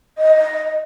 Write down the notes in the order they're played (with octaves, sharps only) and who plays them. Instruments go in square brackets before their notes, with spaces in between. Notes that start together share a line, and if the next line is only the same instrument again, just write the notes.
[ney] D#5